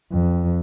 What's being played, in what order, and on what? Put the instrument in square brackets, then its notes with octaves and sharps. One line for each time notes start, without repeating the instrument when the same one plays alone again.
[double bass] F2